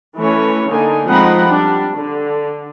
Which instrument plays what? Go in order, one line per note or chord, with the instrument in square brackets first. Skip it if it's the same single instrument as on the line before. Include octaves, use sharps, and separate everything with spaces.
[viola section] E3 A3 C#4 C#5
D3 A#3 D#4 G#5
F3 G#3 C4 D#4 F#5 B5
G3 D4
D3